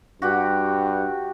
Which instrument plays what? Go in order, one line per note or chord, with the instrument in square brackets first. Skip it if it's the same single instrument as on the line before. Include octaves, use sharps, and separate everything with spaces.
[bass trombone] G2 [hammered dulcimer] F#4 G4 G5